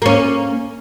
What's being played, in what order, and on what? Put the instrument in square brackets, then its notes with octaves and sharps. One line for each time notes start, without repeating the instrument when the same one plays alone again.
[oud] A#3 C#4